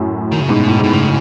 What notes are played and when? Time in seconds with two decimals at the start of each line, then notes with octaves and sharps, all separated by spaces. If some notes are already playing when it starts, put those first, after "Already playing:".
Already playing: F#2 A2
0.32 D#3
0.40 C#3
0.49 G#2 B2
0.68 A2
0.79 G#2
0.83 B2
0.93 C#3